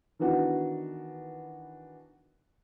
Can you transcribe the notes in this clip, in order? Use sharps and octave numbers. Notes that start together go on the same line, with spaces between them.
D#3 E3 B3 D4 F#4